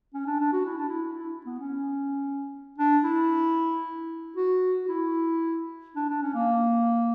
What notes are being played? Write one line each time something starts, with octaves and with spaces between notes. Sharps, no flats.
C#4
D4
D4
F#4
E4
D4
E4
E4
B3
C#4
D4
E4
F#4
F#4
E4
D4
D4
C#4
A#3